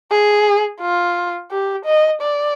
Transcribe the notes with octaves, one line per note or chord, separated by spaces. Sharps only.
G#4
F4
G4
D#5
D5